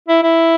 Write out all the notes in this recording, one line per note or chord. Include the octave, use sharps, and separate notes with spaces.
E4
E4